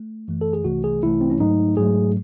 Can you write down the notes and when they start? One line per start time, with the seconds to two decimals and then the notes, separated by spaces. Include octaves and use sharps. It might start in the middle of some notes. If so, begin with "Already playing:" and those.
Already playing: A3
0.28 F#2 E3 A3
0.41 A4
0.53 G#4
0.64 C2 C3 E3 A3 F#4
0.84 G#4
1.03 C2 C3 E3 A3 E4
1.21 C4
1.30 C#4
1.39 G#2 F#3 A3 D#4
1.77 G#2 F#3 A3 G#4